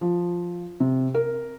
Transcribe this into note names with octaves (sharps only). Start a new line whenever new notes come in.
F3
C3
A#4